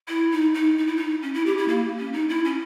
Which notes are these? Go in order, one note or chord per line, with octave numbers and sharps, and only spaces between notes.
E4
D#4
D#4
D#4
E4
D#4
C#4
E4
G4
E4
A#3
C#4
D#4
E4
C#4